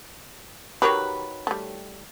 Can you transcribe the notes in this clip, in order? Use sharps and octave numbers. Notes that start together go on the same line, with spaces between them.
D#3 F#3 G4 A#4 B4 C#5
G3 A3